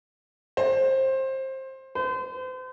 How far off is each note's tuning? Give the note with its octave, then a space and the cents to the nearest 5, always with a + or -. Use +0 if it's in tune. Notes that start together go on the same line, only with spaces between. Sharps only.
C5 +20
C5 -40